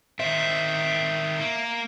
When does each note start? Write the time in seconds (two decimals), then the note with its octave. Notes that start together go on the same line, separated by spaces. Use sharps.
0.20 D#3 C4 E5
1.40 A#3